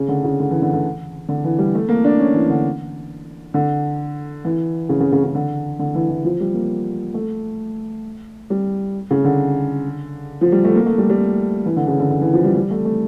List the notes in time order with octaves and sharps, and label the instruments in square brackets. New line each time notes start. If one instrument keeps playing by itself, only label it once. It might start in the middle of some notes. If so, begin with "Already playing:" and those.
Already playing: [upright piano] C#3
D3
C#3
D3
E3
D3
D3
D3
E3
G3
A3
A#3
D4
C#4
E3
D3
D3
E3
C#3
C#3
C#3
C#3
D3
D3
E3
E3
F3
G3
A#3
A3
G3
C#3
D3
F3
G3
A3
A#3
A3
G3
G3
E3
D3
C#3
D3
D3
E3
F3
G3
G3
A3
A3